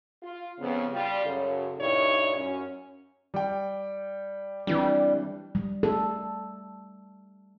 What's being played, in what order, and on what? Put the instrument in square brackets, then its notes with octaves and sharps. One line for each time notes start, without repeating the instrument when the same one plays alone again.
[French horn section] F4
F2 C#3 B3
G3 F4
F#2 C#3 A4
G2 A#2 D#4 E4 G4 C#5
F#2 C#4
[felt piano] G3 G5
[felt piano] E3 C4 D4 [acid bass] G3
[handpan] G3
A4